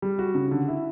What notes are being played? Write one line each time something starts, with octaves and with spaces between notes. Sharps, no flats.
G3
F#4
C#3
D3
E4